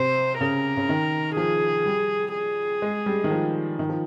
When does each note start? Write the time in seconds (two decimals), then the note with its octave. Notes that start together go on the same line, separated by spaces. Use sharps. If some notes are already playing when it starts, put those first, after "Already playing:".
Already playing: C3 C5
0.41 C#3 A#4
0.77 C#3
0.89 D#3
1.37 F3 G#4
1.86 G3
2.34 G#4
2.82 G#3
3.06 G3
3.24 D#3
3.31 F3
3.79 D#3
3.89 F3